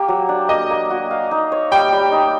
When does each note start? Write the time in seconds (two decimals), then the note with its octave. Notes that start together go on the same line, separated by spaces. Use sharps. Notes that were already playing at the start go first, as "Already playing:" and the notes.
Already playing: A#3 G4
0.08 F#3
0.29 D4
0.49 A#3 D#5
0.70 A#3
0.90 F#4
1.11 F5
1.31 D#4
1.52 C#5
1.71 G3 G5
1.92 G3
2.12 D#4